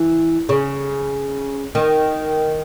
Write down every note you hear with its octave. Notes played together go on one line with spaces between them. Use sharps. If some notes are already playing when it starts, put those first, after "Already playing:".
Already playing: E3
C#3
D#3